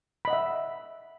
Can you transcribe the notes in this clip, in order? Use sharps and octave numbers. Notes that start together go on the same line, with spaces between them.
D#5 E5 F#5 B5